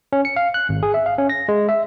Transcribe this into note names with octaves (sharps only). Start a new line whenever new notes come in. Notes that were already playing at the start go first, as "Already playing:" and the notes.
C#4
C#7
F5
F#6
G#1
G#4
E5
F5
C#4
A#6
G#3
E5